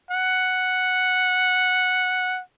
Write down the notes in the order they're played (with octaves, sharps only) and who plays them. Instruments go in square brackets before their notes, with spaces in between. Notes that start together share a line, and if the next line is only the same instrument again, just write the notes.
[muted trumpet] F#5